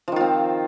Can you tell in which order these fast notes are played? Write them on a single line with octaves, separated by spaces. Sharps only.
F3 D#3 F4 C4